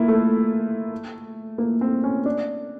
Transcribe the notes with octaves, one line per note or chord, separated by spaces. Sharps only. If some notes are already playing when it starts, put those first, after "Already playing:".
Already playing: A#3 E4 F4
A3
A#3
C4
C#4
D4